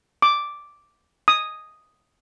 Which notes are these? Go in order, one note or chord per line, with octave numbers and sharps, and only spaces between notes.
D6
D#6